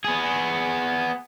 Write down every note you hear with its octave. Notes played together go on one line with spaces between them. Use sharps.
B3 G#4